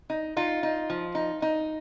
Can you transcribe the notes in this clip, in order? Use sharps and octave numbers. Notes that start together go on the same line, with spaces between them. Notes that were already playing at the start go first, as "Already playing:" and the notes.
D#4
D#4 F4
D#4
F3
D#4
D#4